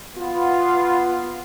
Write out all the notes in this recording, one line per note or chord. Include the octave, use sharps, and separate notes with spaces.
B3 F4